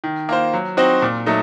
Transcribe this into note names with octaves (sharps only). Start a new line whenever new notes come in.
D#3
A#3 F4 C5
F#3
C4 D#4 F#4 C5
A#2
F#3 A3 D#4